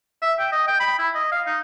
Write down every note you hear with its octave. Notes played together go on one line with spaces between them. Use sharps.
E5
G5
D#5
G5
B5
E4
D#5
F5
D#4